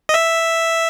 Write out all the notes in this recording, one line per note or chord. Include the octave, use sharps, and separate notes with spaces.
D#5
E5